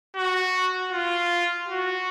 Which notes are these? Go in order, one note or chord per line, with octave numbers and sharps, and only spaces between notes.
F#4
F4
F#4